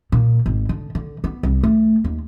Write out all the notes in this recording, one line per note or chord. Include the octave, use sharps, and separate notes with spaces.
A#2
G#1
D3
D3
B3
C2
A3
D#2